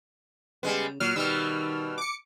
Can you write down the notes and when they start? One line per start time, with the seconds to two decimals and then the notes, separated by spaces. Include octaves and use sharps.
0.63 C#3 G3 G#3 B3
1.00 A#2 F#3 F6
1.16 B2 D#3 G3 E6 F6
1.98 D6 C#7